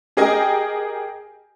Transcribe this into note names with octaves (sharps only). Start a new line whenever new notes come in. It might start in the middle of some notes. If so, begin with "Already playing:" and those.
G4 G#4 A#4 D#5 G5 G#5